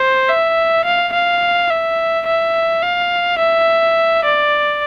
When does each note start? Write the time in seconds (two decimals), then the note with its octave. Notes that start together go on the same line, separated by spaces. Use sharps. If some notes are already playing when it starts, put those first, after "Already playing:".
Already playing: C5
0.29 E5
0.85 F5
1.13 F5
1.70 E5
2.26 E5
2.83 F5
3.39 E5
4.24 D5